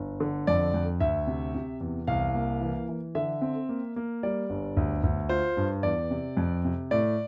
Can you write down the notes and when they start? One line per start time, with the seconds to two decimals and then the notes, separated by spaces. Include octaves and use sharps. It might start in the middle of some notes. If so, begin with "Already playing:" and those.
Already playing: G1
0.20 D3
0.47 F2 D5
0.74 F2
1.00 D2 E5
1.27 C3
1.55 C3
1.81 E2
2.07 C2 F5
2.34 A#3
2.61 E3
2.89 E3
3.15 D3 E5
3.42 C4
3.69 A#3
3.96 A#3
4.23 G3 D5
4.50 G1
4.77 D2
5.03 D2
5.29 F4 C5
5.57 G2
5.83 E2 D5
6.11 C3
6.37 F2
6.65 C3
6.91 A2 D5